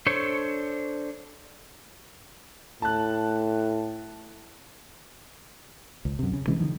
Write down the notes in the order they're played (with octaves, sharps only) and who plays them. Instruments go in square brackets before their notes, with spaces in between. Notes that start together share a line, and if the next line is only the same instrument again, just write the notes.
[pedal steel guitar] D4 A4 C5 C#5 C#6
[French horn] A2 [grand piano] A5 F#6
[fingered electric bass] C#2
F#2 C3
C#3
C3 E3 G#3 C#4
D3 D#3 F3